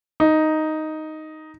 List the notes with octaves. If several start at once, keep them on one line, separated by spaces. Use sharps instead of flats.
D#4